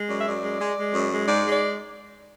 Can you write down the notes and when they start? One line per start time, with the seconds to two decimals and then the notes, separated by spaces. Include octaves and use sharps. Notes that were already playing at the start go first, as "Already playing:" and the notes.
Already playing: G#3
0.09 F#2 D5
0.20 E5
0.27 F#2 D5
0.43 G#3
0.60 G#3
0.77 G#3
0.94 F#2
1.10 G#3
1.27 G#2 D5
1.44 G#3
1.52 D5